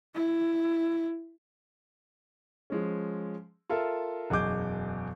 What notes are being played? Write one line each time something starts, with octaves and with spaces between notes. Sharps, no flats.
E4
F3 G#3 C#4
F4 A4 A#4 E5
E1 F#2 G#4 D#5 D6 G6